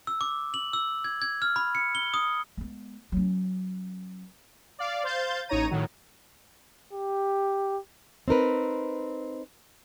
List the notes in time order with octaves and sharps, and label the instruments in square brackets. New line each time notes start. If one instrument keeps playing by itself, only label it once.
[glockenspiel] E6
D6
F#7
E6
G#6
G#6
F6
B5
C#7
G7
D#6
[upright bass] G#3 B3
F#3 C#4
[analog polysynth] D5 F5
C5 F5 C6 G6 A6
A1 D#4 C#5 A#5 D#7
A2 D#3 F#3
[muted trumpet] G4
[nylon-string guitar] C4 D#4 A#4 B4